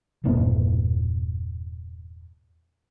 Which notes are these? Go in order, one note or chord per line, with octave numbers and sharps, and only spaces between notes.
E1 G2 A#2 D4